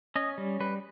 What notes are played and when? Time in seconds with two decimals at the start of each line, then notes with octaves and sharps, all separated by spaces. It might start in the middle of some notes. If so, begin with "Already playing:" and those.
0.16 C#4 D#5
0.38 G3
0.60 G3 B4